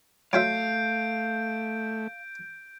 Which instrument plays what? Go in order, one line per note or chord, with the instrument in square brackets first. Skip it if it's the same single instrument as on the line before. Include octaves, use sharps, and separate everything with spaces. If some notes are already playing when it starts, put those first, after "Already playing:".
[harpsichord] F#3 F4 E5 [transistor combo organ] A3 [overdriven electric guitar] F5 [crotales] G6 D7